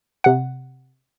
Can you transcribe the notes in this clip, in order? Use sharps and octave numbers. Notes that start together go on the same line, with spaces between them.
C3 F#5